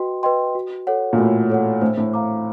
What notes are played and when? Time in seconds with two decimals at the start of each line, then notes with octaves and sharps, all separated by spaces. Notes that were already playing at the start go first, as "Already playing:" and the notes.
Already playing: F#4 B4 D#5 G5 C6
0.23 B4 D#5 G5 C6
0.55 F#4
0.87 A4 C#5 F#5
1.13 A#2
1.18 A2 F#4
1.50 A4 C#5 F#5
1.81 A2 C5
1.97 A2
2.13 F5 A#5 D6